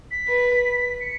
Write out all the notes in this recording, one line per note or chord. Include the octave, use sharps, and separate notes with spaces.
B6
B4
C#7